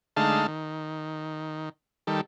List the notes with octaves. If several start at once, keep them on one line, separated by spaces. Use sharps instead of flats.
D3 G#3 A3 D#4 F5 A5
D#3
D#3 G3 A4